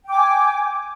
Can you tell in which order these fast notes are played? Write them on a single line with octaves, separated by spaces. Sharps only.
G5 D6 G#5